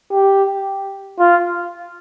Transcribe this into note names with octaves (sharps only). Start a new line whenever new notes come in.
G4
F4